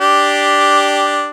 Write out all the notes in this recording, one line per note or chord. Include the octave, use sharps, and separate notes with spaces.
D4 G4